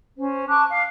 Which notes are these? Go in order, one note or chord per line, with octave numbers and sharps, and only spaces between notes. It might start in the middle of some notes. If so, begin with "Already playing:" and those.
C#4 C5
A5 C#6 D6 F#6
F5